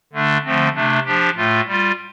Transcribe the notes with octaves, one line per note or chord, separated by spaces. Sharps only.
D3 A3 D4
D3 F3 A3 C4
C3 A3 D4
F3 D4 G4
A2 A3 F4
G3 F4